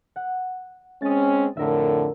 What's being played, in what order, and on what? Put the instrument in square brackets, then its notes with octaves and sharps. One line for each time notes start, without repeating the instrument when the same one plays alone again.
[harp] F#5
[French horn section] G#3 C4 C#4 [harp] D#6 A6
[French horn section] F2 A2 D3 [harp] A#4 E5